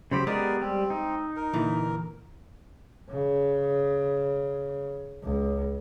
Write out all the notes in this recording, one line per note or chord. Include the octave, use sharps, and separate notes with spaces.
C#3 F#3 G4 C5 B5
G#3 B3 G4 G#4 A#4 D5
G3 C4
D#4
A#4
A#2 D3 E3
C#3
C#2